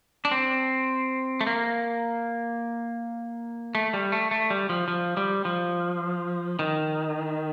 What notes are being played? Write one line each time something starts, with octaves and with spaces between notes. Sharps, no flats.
D4
C4
A3
A#3
A3
G3
A3
A3
G3
F3
F3
G3
F3
D#3